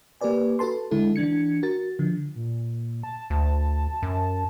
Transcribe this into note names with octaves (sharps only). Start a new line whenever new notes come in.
A#3 G4 A#4 B4 D5 G#5
F#4 A4 B4 A5 C6
D3 G#3 E4 A4
E3 D4 G#6 C#7
F#4 A#4 A6
D3 F3
A#2
A5
D2
F#2